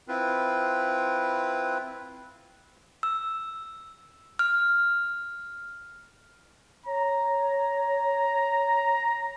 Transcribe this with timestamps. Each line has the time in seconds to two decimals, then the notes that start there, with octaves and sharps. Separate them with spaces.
0.08 C4 E4 F4 B4
3.03 E6
4.39 F6
6.86 C#5 A#5